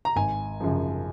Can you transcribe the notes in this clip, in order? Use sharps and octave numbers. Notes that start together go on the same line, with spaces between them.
A#5
G#1 G#5
F#2 C#3 F3